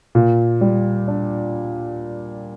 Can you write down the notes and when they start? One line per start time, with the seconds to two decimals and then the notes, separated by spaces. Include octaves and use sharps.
0.15 A#2
0.61 G3
1.08 D4